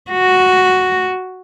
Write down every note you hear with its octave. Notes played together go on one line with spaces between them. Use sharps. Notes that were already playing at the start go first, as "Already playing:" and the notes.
F#4